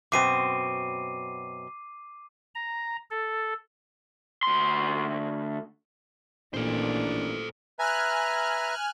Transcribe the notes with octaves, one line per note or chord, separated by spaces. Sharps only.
F#2 B2 C4 D6 C7 D#7
A#5
A4
D2 C6
A1 A#2 D#3 D4 A4 C5
B4 E5 G#5 A#5 F6 F#6